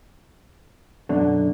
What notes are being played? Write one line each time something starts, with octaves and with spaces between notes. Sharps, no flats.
F#2 B2 D3 D5